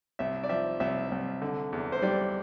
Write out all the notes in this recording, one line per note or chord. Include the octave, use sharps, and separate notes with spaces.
C2 E5
D5
F3 E5
C2 E5
C2
D3
E2
C5
G3 D5